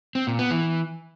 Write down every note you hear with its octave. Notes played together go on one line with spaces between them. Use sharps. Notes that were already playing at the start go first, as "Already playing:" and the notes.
C4
A#2
B3
E3